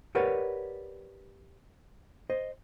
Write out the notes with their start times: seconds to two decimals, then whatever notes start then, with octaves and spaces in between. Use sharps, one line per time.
0.15 G4 A#4 B4 C#5 D5 F#5
2.30 C5 D#5